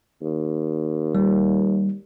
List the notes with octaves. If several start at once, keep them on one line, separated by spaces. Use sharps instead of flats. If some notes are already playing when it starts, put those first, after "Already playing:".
D#2
G3